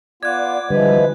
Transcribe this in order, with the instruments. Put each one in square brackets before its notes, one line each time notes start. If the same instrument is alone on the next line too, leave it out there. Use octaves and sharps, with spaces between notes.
[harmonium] B3 F4 [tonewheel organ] D5 [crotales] F#6 G#6
[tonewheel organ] D3 G3 [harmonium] E3 F3 G#3 [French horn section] B4